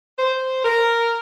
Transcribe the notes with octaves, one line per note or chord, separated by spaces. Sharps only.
C5
A#4